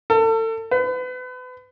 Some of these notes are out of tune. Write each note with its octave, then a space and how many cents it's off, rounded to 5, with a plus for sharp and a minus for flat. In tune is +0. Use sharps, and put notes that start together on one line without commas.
A4 +35
B4 +35